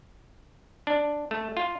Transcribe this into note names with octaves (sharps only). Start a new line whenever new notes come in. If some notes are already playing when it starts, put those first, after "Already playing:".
D4
A3
F4